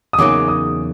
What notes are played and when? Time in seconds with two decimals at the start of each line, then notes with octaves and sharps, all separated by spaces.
0.13 D#6
0.18 E2 C#3 F#3 A#3 D#4 D6
0.48 D#6